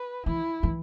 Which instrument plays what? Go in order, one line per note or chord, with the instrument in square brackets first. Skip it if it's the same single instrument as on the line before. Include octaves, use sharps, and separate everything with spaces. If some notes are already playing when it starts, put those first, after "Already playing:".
Already playing: [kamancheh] B4
[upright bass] E3 [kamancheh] E4
[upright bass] E3